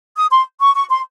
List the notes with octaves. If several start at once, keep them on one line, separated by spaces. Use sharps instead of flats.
D#6
C6
C#6
C#6
C6